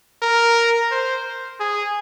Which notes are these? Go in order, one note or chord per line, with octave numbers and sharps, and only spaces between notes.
A#4
C5
G#4